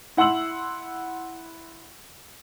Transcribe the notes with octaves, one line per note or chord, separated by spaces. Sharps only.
E4 F#5 C6 E6 F#7